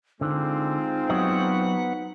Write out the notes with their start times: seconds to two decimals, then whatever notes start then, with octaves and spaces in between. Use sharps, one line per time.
0.21 D3 G#3 C4 D#4 F4
1.10 F#3 B3 C#5 D#5 F#5